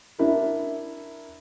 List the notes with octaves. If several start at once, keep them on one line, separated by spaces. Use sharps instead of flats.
D4 E4 A#4